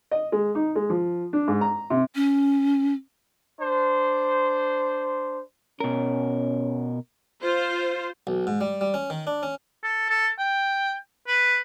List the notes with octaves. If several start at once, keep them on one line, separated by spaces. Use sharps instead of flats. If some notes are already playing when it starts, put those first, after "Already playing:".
D#5
G#3
D#4
G#3
F3
D4
G#2
A#5
C3
C#4
D4 C5
B2 C#4 A#4
F4 C5
B1
G#2
G3
G3
C#4
D#3
D4
C#4
A4
A4
G5
B4